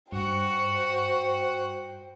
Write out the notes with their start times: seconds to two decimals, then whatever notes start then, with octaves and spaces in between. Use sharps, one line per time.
0.12 G2 F#4 C5 F#5 G5